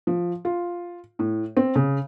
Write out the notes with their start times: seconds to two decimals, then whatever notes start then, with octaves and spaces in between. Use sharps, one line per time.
0.07 F3
0.45 F4
1.19 A2
1.57 C4
1.76 C#3